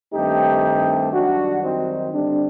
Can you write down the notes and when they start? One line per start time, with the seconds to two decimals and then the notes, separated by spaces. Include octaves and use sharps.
0.13 G2 D#3 A3 C4 D#4 G4
1.13 F#2 D#3 G3 D4 F#4
1.63 C4 D#4
2.12 D3 G3 C4 D4